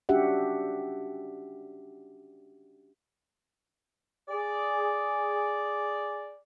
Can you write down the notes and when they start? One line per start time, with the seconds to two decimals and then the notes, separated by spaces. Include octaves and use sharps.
0.09 C#4 D4 F#4 G4 E5 F#5
4.29 G#4 D5